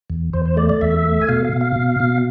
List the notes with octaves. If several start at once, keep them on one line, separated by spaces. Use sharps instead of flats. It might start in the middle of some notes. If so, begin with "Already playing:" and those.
E2
E2 C5
C5
A3 D5
D5
E2 E5
A3
G#5
B2 F5
F5
B2
F5
B2
B2